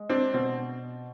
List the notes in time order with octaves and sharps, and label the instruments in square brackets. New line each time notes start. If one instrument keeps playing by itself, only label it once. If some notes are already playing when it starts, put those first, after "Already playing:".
Already playing: [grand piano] G#3
C4 D4
B2 C4